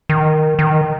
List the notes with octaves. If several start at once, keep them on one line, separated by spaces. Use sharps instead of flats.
D#3
D#3